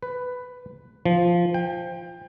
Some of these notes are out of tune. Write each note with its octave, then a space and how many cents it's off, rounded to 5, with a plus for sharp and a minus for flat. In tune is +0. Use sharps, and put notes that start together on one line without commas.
B4 +10
F3 -5
G5 +25